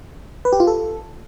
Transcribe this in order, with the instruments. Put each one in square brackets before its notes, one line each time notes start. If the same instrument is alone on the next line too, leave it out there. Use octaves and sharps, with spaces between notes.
[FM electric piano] B4
G4
F4
A4